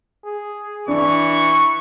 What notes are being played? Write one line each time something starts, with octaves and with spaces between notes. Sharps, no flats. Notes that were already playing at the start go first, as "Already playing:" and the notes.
G#4
E3 D4 C#6